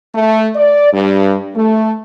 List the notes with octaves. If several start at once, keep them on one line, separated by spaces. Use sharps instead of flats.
A3
D5
G2
A3